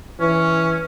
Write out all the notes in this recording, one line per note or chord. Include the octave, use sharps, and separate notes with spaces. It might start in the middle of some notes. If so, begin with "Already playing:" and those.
E3 C#4